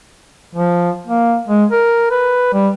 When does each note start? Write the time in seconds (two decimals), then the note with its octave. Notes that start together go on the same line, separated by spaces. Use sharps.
0.55 F3
1.07 A#3
1.48 G#3
1.71 A#4
2.11 B4
2.53 G3